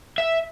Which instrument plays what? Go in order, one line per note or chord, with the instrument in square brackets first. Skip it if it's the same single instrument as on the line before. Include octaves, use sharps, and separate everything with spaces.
[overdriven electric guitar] E5